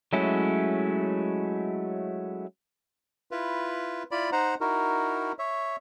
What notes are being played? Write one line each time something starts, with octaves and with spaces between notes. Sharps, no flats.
F#3 G#3 A3 C#4 E4
E4 F4 B4
E4 F4 D5 B5
D#4 C5 F#5 A#5
D#4 E4 F#4 A#4
C#5 E5